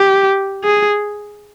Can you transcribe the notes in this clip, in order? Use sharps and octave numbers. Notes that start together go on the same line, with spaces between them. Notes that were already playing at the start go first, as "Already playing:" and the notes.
Already playing: G4
G#4